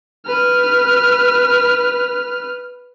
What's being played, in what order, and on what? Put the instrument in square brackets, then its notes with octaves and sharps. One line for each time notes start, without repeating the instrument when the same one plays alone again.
[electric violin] B4 F6